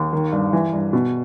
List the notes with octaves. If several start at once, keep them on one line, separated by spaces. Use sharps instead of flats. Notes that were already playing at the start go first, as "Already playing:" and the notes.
Already playing: D#2
D#3
G2
E3
G2
B2